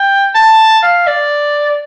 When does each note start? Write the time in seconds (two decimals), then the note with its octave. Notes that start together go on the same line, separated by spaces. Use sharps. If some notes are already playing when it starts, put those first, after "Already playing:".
Already playing: G5
0.35 A5
0.83 F5
1.07 D5